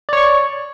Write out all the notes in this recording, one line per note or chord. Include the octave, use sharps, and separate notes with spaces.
C#5 D5 C#6